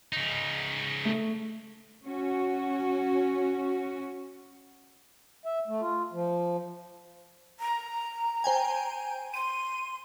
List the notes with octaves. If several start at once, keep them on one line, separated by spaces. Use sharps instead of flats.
C#3 D#4
A3
C#4 F#4
E5
A3
F4
F3
A#5
C5 G5 G#5
C6 D#7